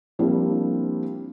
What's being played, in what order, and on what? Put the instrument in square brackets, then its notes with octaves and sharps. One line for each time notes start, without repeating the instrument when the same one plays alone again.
[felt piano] F3 G3 A#3 C4 D4 E4